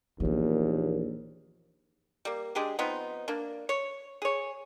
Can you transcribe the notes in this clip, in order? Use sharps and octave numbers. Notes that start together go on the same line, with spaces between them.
A#1 D#2 E3 B3
G3 A#3
G#3 D4 G4 G#4
F3 B3 C4 D#4
A#3 D4
C#5
G#4 C#5